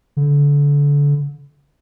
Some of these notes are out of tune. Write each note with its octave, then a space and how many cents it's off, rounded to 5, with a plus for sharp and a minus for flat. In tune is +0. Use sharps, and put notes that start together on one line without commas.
D3 -30